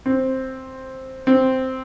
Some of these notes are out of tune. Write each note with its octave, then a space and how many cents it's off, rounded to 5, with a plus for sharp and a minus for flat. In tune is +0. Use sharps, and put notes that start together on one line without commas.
C4 +5
C4 -5